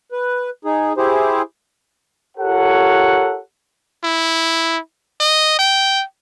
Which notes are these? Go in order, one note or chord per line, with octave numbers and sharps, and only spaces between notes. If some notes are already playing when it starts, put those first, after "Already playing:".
B4
D#4 G#4
E4 G4 G#4 C5
F4 G4 A4 A#4 C#5 F#5
E4
D#5
G5